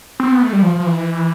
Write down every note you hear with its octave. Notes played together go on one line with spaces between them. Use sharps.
C4
B3
A3
G3
F3
F3
E3